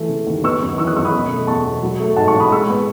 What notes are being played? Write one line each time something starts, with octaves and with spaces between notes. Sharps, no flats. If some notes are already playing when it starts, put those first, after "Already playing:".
Already playing: E3 A3
C#3
D#2
B3 C#6 E6
F#2
E3 C#6 E6
D#6 F#6
F#2 C#6 E6
B5 D#6
B2
A3
E2 A5 C#6
E1
F#3
A3
G#2 F#5 A5
A5 C#6
A1
B5 D#6
G#3 C#6 E6
B3